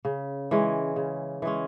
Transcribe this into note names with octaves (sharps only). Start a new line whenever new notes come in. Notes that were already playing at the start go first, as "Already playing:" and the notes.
C#3
E3 G#3 C#4
C#3
E3 G#3 C#4